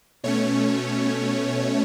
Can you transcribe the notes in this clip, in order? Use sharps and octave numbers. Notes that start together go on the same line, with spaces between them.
B2 A3 C#4 C#5